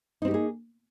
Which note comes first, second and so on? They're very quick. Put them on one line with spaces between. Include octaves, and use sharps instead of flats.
D#4 C4 G4 A#3 G#4